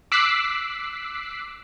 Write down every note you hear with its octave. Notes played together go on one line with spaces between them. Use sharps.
D6 E6 F#6 B6 C7